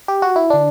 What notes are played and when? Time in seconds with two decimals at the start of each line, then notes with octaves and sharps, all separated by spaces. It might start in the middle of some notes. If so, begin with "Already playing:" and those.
0.08 G4
0.22 F#4
0.36 E4
0.50 D3 D4